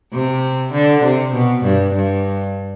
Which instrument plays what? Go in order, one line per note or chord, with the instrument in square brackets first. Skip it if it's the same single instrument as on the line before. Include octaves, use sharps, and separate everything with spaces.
[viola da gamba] C3
D3
C3
B2
G2
G2